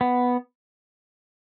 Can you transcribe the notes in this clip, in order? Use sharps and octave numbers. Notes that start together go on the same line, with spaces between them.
B3